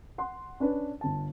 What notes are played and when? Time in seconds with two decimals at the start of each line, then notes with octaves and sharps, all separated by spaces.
0.18 F#5 C6
0.60 C#4 D4 B4
1.01 G1 A5